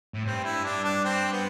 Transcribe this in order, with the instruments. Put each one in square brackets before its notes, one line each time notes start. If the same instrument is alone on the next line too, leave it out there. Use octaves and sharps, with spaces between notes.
[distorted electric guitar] A2
[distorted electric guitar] G2 [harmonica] C4
[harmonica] E4
D4
D4
C4
B3